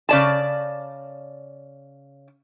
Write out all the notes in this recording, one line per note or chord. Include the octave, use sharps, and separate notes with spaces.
C#3 D5 A5